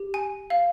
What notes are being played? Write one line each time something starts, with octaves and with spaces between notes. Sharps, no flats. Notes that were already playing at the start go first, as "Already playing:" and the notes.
Already playing: G4
G#5
F5